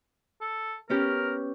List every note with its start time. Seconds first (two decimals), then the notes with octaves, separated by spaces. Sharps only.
0.41 A4
0.89 B3 C#4 G4 A#4